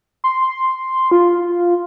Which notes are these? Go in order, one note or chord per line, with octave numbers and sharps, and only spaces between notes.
C6
F4